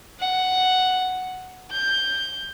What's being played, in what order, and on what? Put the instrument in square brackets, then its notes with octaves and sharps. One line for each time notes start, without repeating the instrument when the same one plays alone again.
[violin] F#5
G6